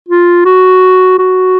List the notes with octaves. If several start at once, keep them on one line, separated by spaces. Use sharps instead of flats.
F4
F#4
F#4